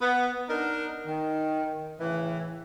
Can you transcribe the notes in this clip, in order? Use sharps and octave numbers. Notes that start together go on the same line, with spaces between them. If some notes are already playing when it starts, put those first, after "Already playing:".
B3
D4 D#4 A#4
D#3
A2 C#3 E3